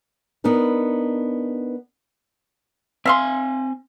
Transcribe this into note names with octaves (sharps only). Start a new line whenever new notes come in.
B3 D4 D#4 A#4 B4
C4 E5 F5 G#5 C6